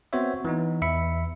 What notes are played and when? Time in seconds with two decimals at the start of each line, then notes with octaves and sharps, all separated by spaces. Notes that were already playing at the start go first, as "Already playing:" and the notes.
0.13 B3 C4 F#4 C5 C#5 E5
0.45 E3 B3 D#4
0.82 E2 E5 B5 C#7